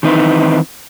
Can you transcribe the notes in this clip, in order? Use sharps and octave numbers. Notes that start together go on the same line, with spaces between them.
D#3 E3 C4 D#4 E4 B4